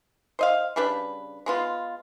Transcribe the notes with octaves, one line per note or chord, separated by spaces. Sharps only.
C5 D#5 F5
C#3 G3 D4 B4
G#3 B3 F4